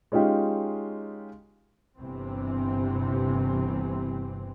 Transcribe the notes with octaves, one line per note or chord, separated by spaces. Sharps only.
G#3 C#4 D#4 F4 G4
G1 C3 E3 C4